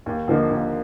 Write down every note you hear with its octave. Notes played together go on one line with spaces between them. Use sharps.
D#2
D3 F3 A#3 D#4
D#2